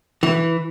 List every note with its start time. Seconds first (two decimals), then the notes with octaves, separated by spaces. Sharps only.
0.23 E3